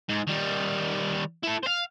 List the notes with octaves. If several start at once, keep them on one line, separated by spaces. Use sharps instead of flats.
G#2
D#3 G3
E4 A4
C5 F5